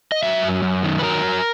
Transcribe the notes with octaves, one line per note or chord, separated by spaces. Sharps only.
D#5
F#3 E5
F#2
F#2
D#3
B4
F#3 A#4